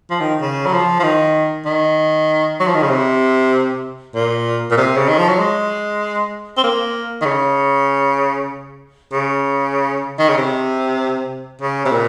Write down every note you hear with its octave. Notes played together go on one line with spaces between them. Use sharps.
F3
D#3
C#3
F#3
F3
F3
D#3
D#3
F#3
F3
D#3
C#3
C3
A#2
A#2
C3
C#3
D#3
F3
F#3
G#3
C4
A#3
D#3
C#3
C#3
D#3
C#3
C3
C#3
C3
A#2